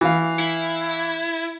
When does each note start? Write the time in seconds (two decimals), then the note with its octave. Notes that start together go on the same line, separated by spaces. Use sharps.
0.01 E3 F5
0.39 E4